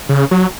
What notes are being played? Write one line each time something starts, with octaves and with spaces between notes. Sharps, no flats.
C#3
F#3